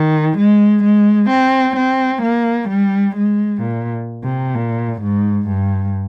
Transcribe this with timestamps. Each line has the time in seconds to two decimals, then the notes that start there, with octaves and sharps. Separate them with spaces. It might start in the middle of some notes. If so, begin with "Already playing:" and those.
Already playing: D#3
0.38 G#3
0.84 G#3
1.30 C4
1.77 C4
2.23 A#3
2.69 G3
3.16 G#3
3.62 A#2
4.24 C3
4.55 A#2
5.02 G#2
5.48 G2